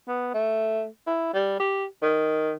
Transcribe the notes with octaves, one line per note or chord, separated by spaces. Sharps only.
B3
A3
E4
G3
G4
D#3